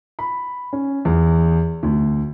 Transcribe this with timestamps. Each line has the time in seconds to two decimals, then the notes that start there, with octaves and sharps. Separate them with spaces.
0.19 B5
0.73 C#4
1.05 E2
1.83 D2